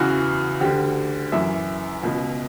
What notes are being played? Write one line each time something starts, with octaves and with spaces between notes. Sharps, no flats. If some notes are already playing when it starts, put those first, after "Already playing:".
Already playing: E2 C#3 E3 F#4
D2 D3 G4
F#2 E3 E5
C#2 B2